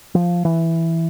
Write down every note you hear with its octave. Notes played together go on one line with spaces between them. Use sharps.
F3
E3